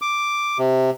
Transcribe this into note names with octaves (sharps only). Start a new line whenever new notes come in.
D6
C3